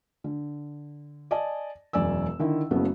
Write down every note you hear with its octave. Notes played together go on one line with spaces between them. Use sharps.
D3
D5 D#5 G#5 A5
E1 F#2 D5 G#5 E6
D3 D#3 E4
F#1 C#3 F#3 A3 B3